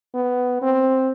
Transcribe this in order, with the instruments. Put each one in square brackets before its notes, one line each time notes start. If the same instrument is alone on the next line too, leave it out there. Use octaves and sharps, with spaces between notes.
[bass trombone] B3
C4